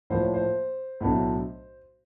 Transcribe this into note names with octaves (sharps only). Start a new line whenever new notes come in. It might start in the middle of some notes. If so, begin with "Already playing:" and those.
A2 F3 A#3 C5
C#5
C5
B1 A2 F#3 A3 D4